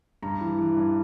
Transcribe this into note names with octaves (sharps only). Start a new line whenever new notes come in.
G2 A#5
E3
E3
G2